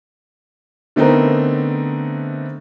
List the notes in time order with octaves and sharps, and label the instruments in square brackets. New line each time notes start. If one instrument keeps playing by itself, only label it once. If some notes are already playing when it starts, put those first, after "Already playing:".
[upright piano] D3 A3 B3 C4 D#4 A#4